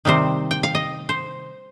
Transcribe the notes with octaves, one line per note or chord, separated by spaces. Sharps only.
C3 D#3 G3 C4 C5
G5
F5
D#5
C5